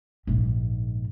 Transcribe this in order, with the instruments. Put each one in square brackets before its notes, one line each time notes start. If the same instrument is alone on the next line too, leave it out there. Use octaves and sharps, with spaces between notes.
[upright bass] A#1 G#2